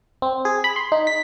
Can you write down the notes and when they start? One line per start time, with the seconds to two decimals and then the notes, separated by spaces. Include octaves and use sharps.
0.22 C4
0.45 G#4
0.64 B5
0.76 C6
0.92 D#4
1.07 B6